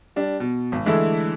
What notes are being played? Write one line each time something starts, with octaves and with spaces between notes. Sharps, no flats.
G3 D4
B2
G#1
D3 E3 G#3 A3 E4 A4